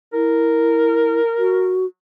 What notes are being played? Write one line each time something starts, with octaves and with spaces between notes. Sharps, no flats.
E4 A#4
F#4